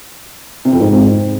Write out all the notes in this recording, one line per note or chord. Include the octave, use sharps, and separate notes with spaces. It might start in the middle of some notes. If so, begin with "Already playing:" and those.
C3
F2
G#2